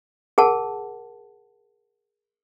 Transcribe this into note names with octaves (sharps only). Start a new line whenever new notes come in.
G#4 A#4 F#5 A5